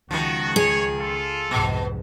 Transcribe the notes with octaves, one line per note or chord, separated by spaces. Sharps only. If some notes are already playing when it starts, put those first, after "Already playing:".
C#2 D#3 F3 F#4
G#4 C#5
F4 A4
C2 F2 G#2 B2